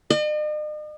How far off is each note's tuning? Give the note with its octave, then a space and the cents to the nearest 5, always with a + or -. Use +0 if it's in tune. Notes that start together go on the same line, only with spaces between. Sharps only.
D#5 -45